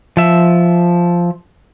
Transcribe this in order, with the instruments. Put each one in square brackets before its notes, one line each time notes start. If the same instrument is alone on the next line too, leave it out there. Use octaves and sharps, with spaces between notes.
[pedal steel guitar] F3 E5